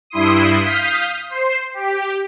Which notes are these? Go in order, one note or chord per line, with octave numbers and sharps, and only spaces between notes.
G2 E4 C6 D#6
F5 D#6 G6 B6
C5 C7
G4